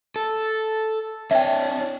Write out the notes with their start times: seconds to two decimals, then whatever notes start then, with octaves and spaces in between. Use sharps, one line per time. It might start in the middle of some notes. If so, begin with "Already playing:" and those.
0.16 A4
1.31 D4 C#5 E5 G5